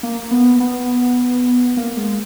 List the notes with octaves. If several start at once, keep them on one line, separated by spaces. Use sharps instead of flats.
A#3
B3
B3
A#3
G#3